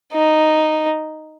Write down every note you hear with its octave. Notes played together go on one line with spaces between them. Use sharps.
D#4